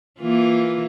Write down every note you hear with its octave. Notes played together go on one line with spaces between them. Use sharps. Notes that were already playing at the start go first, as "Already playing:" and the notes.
E3 A#3 F4